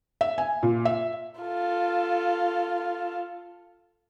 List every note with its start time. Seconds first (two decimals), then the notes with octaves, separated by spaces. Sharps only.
0.21 E5
0.38 G#5
0.63 A#2
0.85 E5
1.41 F4 A4